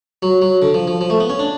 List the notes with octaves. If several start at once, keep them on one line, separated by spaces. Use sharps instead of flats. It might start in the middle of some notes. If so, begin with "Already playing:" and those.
F#3
F#3
D3
F3
F3
F3
A3
B3
C#4
D4